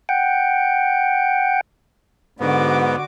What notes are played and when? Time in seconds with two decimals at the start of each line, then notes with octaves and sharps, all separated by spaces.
0.09 F#5 G5
2.40 G#2 D3 B3 F#4 D6